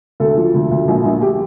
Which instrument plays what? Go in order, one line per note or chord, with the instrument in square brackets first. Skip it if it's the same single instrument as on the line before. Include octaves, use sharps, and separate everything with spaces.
[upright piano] D2 A4
F3
D2
D2
A#1
A#1
G4